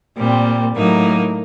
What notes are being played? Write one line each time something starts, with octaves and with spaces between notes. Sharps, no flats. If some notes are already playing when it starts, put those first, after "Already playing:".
A#2 G3 C4
A2 F#3 A#3 D#4